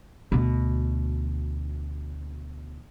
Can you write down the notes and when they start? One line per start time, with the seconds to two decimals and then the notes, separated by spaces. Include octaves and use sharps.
0.32 D2 B2